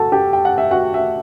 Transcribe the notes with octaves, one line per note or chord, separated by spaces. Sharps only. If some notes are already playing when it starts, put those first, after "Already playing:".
Already playing: F#4 A4 A5
G4 G5
G5
F#5
E5
F#4 F#5
E5